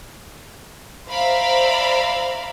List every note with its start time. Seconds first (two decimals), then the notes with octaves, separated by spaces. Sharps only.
1.10 C5 D5 E5 F5 A#5 B5